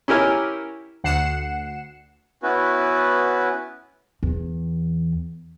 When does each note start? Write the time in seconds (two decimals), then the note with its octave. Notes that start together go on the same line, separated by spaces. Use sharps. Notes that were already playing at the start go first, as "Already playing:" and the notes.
0.08 C#4 E4 G4 A#4 G#5
1.04 D2 F#5 C7 C#7 E7
2.43 B3 C#4 E4 F#4 B4
4.23 E2